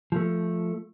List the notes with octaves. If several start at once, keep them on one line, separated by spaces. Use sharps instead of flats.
F3 A3